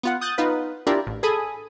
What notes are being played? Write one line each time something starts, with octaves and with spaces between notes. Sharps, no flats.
B3 F4 F#5
D#6 F#6 G6 A6
B3 D#4 F4 B4
D4 E4 F4 G4 A#4 D5
A1
G#4 A4 G#5 B5 D#6